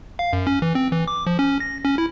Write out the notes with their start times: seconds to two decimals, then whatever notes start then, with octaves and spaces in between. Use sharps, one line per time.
0.19 F5
0.33 F#2
0.47 C#4
0.62 E3
0.75 C4
0.92 E3
1.08 D6
1.27 F3
1.39 C#4
1.60 A#6
1.85 C#4
1.98 E4